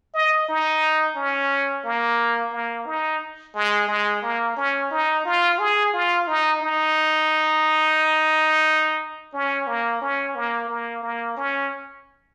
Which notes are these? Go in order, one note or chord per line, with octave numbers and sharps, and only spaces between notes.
D#5
D#4
C#4
A#3
A#3
D#4
G#3
G#3
A#3
C#4
D#4
F4
G#4
F4
D#4
D#4
C#4
A#3
C#4
A#3
A#3
A#3
C#4